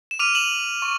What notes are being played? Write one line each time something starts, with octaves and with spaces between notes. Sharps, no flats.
E7
D6 F6 D#7 F7
E7 F#7
C#6